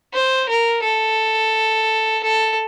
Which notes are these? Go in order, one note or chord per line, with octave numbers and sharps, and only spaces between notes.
C5
A#4
A4
A4